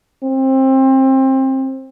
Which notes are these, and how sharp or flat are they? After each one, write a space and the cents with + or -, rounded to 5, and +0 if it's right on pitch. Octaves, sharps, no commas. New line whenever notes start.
C4 +25